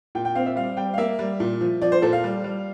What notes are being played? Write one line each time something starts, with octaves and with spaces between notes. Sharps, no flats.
A#2 G5
G5
C4 F5
E5
G3 F5
G3 G5
F5
A#3 E5
G3
A#2
F3
F3 D5
C5
A#2 A4
F5
G3
G3